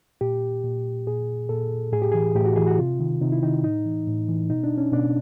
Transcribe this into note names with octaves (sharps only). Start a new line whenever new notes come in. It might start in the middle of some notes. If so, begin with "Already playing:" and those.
A#2 G4
A#2
A#2 G#4
A#2 A4
A2 G#4
G4
E3 G#4
A2 G4
F#4
E3 G#4
F#4
C3 F4
D#3
C3 D#4
E4
D#3 D#4
A2 D#4
E3
A2
E3
B2 D#4
D4
C#4
B2 D4